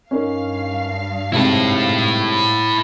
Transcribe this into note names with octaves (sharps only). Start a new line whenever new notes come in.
G2 C#4 D#4 A#4 F5
G#2 C3 E4 A4